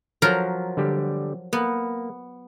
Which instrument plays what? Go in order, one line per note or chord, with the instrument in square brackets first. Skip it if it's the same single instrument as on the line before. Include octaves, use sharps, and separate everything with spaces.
[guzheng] F3 F#3 A#4
[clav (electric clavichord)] D3 G3 G4
[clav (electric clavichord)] A#3 [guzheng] B3